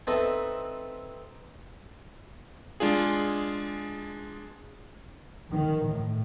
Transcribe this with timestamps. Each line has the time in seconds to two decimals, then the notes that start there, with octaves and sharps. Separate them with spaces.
0.07 C4 D#4 A4 B4 E5 B5
2.80 G#3 D4 F4 G#4
5.52 D#3
5.86 A2